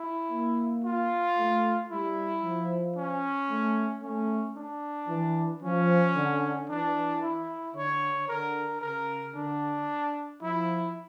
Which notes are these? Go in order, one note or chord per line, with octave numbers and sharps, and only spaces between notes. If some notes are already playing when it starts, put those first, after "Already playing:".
Already playing: E4
A#3
F4
A3
G3 E4
F3
C#4
A3
A3 C#4
D4
E3
F3 C#4
D3
E3 D4
E4
D3 C#5
D3 A#4
C#3 A#4
D3 D4
F3 E4